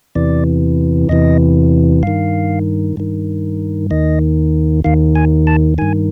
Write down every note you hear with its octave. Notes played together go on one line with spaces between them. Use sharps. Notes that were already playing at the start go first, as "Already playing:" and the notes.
E2 C3 E3 D5
E2 C3 E3 D#5
G2 D#3 F5
G2 D#3
D#2 D#3 D#5
D#2 D#3 F5
G#5
A5
G2 D#3 G#5